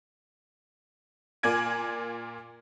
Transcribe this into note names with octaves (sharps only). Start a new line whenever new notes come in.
A#2 A#3 D5 G#5 G#6 D7